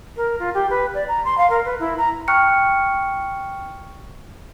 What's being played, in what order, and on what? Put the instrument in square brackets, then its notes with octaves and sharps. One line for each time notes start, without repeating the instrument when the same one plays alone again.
[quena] A#4
F4
G4
B4
D5
A#5
C6
F5
A#4
B4
E4
A#5
[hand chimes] G5 C#6 F6 F#6 C#7